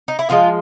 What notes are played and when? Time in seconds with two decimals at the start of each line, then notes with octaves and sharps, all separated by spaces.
0.08 D#4
0.19 E4
0.29 D3 F3 G#3 F4